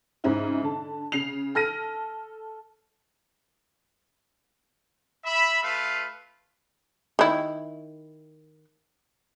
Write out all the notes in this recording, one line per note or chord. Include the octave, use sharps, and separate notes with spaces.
G#2 C#3 C4 C#4 D#4 E4
D3 A5
C#3 C7 F7
A4 F6 A#6 D#7
E5 B5
A3 F4 B4 F5
D#3 E4